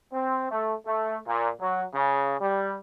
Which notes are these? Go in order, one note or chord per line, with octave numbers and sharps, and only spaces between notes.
C4
A3
A3
A#2
F#3
C#3
G3